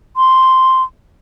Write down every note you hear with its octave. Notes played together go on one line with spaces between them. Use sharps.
C6